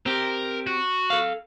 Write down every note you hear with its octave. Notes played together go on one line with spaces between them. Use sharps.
C4 G4 A#4
F#4
A4 F5